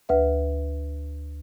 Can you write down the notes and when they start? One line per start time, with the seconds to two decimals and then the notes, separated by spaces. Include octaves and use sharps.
0.09 D2 B4 E5